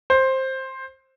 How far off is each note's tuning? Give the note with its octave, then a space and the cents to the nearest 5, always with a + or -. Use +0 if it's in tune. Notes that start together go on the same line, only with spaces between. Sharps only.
C5 +10